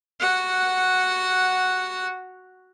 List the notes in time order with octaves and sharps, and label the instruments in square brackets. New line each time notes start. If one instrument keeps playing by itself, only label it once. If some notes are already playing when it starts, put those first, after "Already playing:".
[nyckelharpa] F#4 F#5